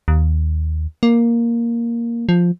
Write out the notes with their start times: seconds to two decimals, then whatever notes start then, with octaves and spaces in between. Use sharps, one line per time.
0.08 D#2
1.03 A#3
2.29 F3